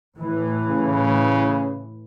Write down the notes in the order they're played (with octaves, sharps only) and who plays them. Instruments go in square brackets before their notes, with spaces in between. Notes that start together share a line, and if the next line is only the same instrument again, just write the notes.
[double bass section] A2 E3
[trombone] C#3